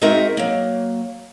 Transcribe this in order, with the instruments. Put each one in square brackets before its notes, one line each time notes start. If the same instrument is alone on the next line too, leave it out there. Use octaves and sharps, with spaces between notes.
[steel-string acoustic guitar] G#3 C4 D#4 F#4 A#4 E5
F#3 A#3